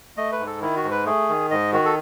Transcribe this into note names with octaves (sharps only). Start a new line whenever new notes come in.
A3 D#5
B4
G#2
A4
D#3 E4
F#4
G#2
B4
A3 G#4
D#3
G#2 D#5
D#3 F#4
A4